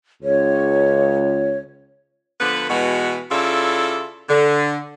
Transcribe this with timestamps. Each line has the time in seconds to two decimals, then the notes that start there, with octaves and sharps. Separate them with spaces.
0.23 C#2 C#5
2.41 D3 F3 B3 B4
2.70 B2 E3 G#3 B3 F#4
3.32 C#3 E4 F4 A4 D5 E5
4.30 D3